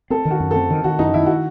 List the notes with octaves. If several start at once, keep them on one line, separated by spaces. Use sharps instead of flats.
C4 A4
D#3
F#4
F#2
C4 A4
D#3
D#3 F#4
F#2 D#4
D#3 E4
F#4